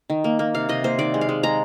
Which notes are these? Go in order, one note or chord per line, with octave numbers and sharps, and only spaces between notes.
D#3
A#3
A#3
C3 F5
C3 D#5
A#3 C5
D#3 D5
G#3
F5
G#3
G#3 A#5